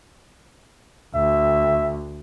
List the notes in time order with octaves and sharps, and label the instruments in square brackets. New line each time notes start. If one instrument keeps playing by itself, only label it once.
[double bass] D2 [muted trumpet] E5